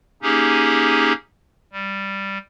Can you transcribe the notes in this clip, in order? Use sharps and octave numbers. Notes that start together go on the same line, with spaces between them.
A#3 C#4 D#4 G4 G#4
G3